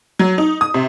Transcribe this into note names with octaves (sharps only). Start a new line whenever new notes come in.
F#3
D#4
D#6
C3